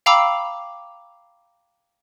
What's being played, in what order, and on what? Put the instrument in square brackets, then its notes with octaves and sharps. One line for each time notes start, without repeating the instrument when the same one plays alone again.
[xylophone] F5 G5 A#5 B5 D6 E6